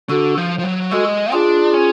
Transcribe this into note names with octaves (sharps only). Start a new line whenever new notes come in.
D3 F#4 A4
F3
F3
F#3
G#3 F#4 A4
D4 F4 G#4
C#4